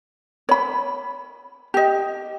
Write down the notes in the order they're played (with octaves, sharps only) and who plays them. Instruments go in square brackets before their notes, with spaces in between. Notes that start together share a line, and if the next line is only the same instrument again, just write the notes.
[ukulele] C#5 B5
G4 D#5